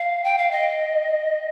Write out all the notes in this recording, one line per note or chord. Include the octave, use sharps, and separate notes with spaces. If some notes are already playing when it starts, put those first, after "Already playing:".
Already playing: F5
G5
F5
D#5